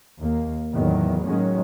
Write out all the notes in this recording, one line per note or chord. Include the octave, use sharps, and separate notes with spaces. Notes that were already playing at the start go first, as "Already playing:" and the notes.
D#2 A#3
E2 A2 D#3 F#3 A3
A2 D#3 F#3 G#3 A#3 C#4